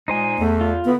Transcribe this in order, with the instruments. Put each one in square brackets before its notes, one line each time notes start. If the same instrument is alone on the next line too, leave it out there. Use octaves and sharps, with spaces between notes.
[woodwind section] A#2 G#3 [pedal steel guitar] D#4 C5 G#5
[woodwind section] E2 [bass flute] A3
[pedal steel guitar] F4
[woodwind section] D3 E4 [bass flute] B3